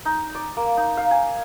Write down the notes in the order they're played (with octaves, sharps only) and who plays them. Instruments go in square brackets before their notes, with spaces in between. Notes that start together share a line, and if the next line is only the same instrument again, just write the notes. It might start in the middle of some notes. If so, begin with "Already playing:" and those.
[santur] D#4
D5
A#3
D#4
F5
G#5